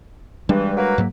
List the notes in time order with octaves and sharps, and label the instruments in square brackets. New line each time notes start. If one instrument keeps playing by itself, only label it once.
[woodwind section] G2 E3 [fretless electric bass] G3 G#3 D4
[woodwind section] F#3 A#3 B4
[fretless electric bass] G#2 F#3 A#3